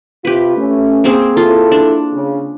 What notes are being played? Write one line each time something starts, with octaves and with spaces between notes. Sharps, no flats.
C3 F4 G4 B4
A3 C#4
A#3 C4 G#4
E4 F4 A4
D4
C#3